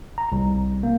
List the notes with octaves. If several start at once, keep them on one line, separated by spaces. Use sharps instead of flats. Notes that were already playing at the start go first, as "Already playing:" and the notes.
A#5
C2
A#3